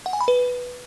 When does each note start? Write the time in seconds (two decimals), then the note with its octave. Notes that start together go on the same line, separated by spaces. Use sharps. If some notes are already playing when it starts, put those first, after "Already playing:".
0.06 F#5
0.13 G#5
0.21 B5
0.28 B4